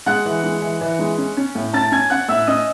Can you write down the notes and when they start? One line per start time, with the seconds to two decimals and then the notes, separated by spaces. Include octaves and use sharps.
0.06 G#3 F#5 F#6
0.25 E3
0.44 G#3
0.62 E3
0.81 E3
0.99 G#3
1.18 C#4
1.37 C#4
1.55 A2
1.73 C#4 A5 A6
1.92 C#4 G#5 G#6
2.10 C#4 F#5 F#6
2.29 A2 E5 E6
2.47 C#4 D#5 D#6